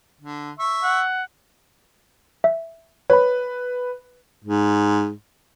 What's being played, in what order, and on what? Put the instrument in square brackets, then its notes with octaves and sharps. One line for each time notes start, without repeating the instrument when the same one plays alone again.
[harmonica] D3
E5 C#6
[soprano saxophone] F#5
[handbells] E5
[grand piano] B4 [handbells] C#5 B5
[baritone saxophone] G#2